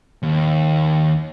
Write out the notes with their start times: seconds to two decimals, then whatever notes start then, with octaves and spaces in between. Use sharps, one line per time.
0.23 D#2